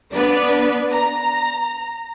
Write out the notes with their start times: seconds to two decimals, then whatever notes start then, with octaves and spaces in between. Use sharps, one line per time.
0.14 B3 D4 B4 D5
0.91 A#5